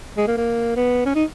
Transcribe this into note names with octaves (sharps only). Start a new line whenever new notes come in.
G#3
A#3
A#3
B3
C#4
D#4